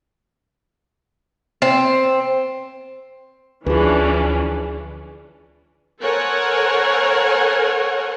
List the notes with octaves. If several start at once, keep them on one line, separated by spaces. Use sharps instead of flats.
C4
D2 E3 F3 C#4 D4 G#4 B4
A4 A#4 C5 C#5 F#5 G#5